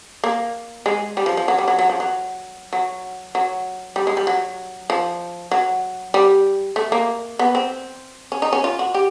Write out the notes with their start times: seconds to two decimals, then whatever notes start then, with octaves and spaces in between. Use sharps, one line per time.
0.24 A#3
0.86 G#3
1.17 G3
1.26 F3
1.37 F3
1.48 F#3
1.58 G3
1.68 F#3
1.79 F#3
1.89 F3
2.00 F#3
2.73 F#3
3.35 F#3
3.96 G3
4.07 G#3
4.17 G3
4.27 F#3
4.90 F3
5.51 F#3
6.14 G3
6.76 A3
6.92 A#3
7.39 B3
7.55 C4
8.32 C#4
8.42 D#4
8.53 C#4
8.64 F4
8.79 F#4
8.94 G4